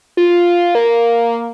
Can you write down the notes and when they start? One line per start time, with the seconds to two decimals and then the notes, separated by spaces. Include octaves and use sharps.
0.17 F4
0.75 A#3